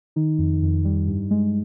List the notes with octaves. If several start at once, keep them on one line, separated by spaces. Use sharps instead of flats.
D#3 D#4
F2
F2
G3
G2
G#3